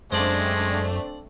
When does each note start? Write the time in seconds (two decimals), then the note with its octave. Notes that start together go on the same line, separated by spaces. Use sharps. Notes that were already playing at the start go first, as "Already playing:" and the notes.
0.12 F#2 G#3 A3 C4 D4 C5 D5 F5